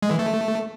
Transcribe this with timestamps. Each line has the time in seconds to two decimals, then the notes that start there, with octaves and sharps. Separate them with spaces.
0.02 G#3
0.11 E3
0.19 A3